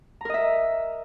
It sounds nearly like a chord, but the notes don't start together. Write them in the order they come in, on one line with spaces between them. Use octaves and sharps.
A#5 A#4 D#5 E5